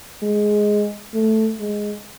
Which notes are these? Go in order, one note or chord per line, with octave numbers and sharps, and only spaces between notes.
G#3
A3
G#3